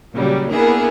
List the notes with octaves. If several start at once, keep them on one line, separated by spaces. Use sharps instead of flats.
A#2 C#3 F#3 G3
A#3 B3 D4 E4 G#4